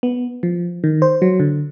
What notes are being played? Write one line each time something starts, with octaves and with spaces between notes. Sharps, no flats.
B3
F3
D#3
C5
F#3
D3